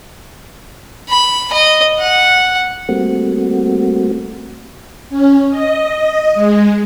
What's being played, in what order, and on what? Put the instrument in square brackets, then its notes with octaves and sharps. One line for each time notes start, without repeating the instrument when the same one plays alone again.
[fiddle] B5
D#5
F#5
[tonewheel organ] G3 A3 A#3 C4 F#4
[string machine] C#4
D#5
G#3